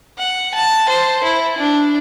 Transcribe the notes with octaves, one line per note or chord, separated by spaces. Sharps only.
F#5
A5
C5
E4
D4